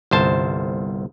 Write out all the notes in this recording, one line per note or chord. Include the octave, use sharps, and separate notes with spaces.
G1 C2 C5 A5